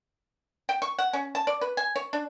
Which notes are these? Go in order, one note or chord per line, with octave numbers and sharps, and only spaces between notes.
G5
C#6
F#5
C#4
A5
D5
B4
G#5
C#5
D4